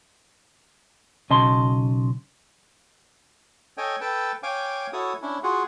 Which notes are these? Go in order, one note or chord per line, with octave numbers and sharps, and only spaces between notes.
B1 C#3 D#5 A5 C6
A4 C#5 D#5 G5 G#5
A4 B4 G5 A5
C#5 F5 G5 G#5 D6
E4 F#4 A4 C#5 D#6
C#4 D4 E4
F4 F#4 G#4 F#5